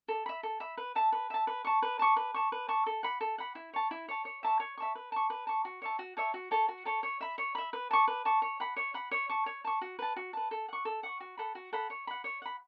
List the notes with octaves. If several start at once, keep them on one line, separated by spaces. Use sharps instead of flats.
A4
E5 B5
A4
E5 B5
B4
E5 A5
B4
E5 A5
B4
A5 C#6
B4
A5 C#6
B4
A5 C#6
B4
A5 C#6
A4
F#5 B5
A4
F#5 B5
E4
C#5 A5
E4
C#5 A5
C#5
E5 A5 C#6
C#5
E5 A5 C#6
B4
A5 C#6
B4
A5 C#6
F#4
C#5 E5 A5
F#4
C#5 E5 A5
F#4
A4 C#5 A5
F#4
A4 C#5 A5
C#5
E5 B5
C#5
E5 B5
B4
A5 C#6
B4
A5 C#6
C#5
F#5 B5
C#5
F#5 B5
C#5
A5 C#6
C#5
A5 C#6
F#4
B4 A5
F#4
B4 A5
A4
F#5 C#6
A4
F#5 C#6
F#4
A4 F#5 B5
F#4
A4 F#5 B5
C#5
F#5 B5
C#5
F#5 B5